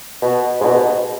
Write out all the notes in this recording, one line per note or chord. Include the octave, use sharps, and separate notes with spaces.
B2
G#2
B2